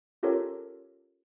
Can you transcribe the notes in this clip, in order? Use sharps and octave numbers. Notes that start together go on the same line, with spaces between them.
C#4 F4 G4 A4 A#4 C#5